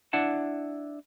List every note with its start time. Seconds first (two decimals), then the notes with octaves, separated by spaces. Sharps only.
0.13 D4 E4 F#5 A5